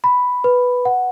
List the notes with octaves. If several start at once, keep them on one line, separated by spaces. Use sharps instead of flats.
B5
B4
F#5